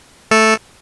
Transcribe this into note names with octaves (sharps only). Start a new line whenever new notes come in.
A3 A4